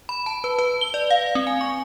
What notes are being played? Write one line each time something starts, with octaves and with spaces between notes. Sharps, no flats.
B5
A5
B4
B4
G7
D5
F5
C4
G#5
C#6